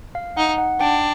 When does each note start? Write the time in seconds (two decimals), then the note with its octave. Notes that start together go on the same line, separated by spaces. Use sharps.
0.15 F5
0.37 D#4 F#5
0.58 F#5
0.80 D4 G5